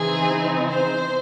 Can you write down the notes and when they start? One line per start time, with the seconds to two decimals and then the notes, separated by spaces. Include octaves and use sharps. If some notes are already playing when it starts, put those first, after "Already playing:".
Already playing: C#3 E3 C4 D#4 G#4
0.69 C5